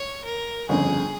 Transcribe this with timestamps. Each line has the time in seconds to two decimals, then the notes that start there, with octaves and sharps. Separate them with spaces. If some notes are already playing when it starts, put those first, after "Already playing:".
Already playing: C#5
0.24 A#4
0.69 G1 F2 C#3 G#4